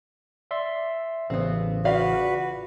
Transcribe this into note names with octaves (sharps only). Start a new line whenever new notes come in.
D5 E5 C6
A1 C#3 B3 C4
F4 F#4 B4 D5 F5